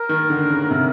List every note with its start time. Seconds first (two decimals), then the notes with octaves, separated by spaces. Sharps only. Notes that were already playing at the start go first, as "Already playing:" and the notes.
Already playing: A#4
0.09 D#3
0.30 D3
0.50 C#3
0.71 C3